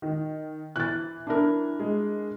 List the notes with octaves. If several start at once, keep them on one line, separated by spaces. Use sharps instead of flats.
D#3
E3 F#6 A6
D4 E4 A#4
G#3